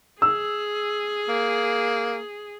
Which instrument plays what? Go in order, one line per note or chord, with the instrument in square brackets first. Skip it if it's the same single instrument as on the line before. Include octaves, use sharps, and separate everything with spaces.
[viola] G#4 [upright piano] E6
[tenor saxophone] A#3